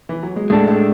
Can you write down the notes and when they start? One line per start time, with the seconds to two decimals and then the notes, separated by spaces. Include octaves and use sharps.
0.09 E3
0.23 F#3
0.36 G#3
0.50 A2 G#3 A3 D4 A4
0.68 A2 A3